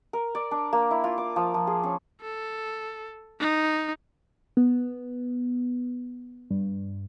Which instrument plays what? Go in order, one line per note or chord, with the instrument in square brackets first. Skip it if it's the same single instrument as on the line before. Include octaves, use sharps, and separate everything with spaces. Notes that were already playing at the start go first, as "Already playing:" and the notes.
[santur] A#4
D5
D4
A#3
E4
F4
D6
F3
F3
G#4
C#4
[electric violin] A4
D#4
[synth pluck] B3
G2